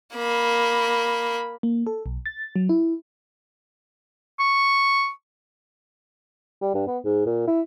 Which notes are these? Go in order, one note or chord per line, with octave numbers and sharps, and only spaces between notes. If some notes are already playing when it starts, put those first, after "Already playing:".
A#3 B5
A#3
A4
B1
A6
F#3
E4
C#6
G3
G2
B3
G#2
A#2
E4